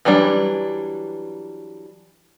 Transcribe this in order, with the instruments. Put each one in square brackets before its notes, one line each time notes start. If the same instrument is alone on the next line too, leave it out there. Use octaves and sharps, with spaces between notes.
[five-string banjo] E3 F#3 G3 D4